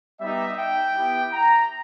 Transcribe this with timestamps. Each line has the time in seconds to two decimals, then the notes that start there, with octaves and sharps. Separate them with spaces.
0.20 G3 B3 D#4 G4 E5
0.57 G5
0.95 B3 E4 G4
1.32 A#5